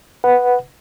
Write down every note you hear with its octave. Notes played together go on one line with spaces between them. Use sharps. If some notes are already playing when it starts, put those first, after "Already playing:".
B4 F#5